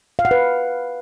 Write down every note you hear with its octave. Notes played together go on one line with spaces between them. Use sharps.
F5
F#5
B4